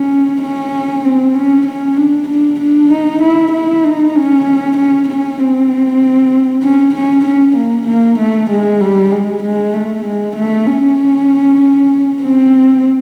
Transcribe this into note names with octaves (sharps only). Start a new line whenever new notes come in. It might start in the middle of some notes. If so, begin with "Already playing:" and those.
Already playing: C#4
C#4
C4
C#4
C#4
D4
D4
D4
D#4
E4
E4
D#4
C#4
C#4
C#4
C4
C#4
C#4
C#4
A#3
A#3
A3
G#3
G3
G#3
G#3
A3
G#3
A3
C#4
C4